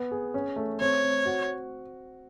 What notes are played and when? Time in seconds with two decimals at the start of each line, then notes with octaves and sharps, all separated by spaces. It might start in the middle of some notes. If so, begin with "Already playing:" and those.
Already playing: B3
0.11 G#4
0.34 C#4
0.56 A3
0.80 C4 C#5
1.03 C4
1.26 F#4